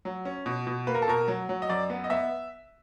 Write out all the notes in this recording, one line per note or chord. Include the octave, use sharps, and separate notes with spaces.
F#3
C#4
B2
B2
A#3 B4
A#4
A4
B2 A#4
F#3
F#3
D#5
F#2 D5
B3
D#5
B3 E5